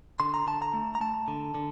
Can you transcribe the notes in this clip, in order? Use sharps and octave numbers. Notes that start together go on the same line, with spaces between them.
D3 C6
A#5
D3 A5
A#5
A3
A#5
A3 A5
D3
D3